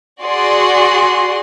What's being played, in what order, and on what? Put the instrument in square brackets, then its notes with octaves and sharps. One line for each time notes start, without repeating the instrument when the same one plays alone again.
[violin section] F#4 G#4 D5 C6